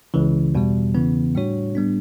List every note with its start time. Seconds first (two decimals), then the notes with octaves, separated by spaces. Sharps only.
0.14 C#2 C#3 E3
0.55 E2 B2 G3
0.94 E2 C#3 E3 B3
1.35 A2 G3 D4 F#4 C#5
1.75 A2 G3 B3 D4